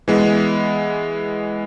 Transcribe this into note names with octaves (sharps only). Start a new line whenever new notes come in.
E3 G#3 B3